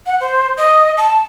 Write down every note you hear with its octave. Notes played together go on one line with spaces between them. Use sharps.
F#5
C5
D#5
A5